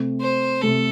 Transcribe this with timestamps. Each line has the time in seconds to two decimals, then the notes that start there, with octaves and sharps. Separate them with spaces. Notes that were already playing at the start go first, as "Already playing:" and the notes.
Already playing: C3 A3 C4
0.21 C5
0.61 C3 A3 C4 A4